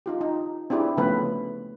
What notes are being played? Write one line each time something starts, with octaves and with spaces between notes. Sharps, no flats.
D#4 F4 G4
D#4
C4 D4 E4 G4 G#4
C#3 F3 A3 B3 B4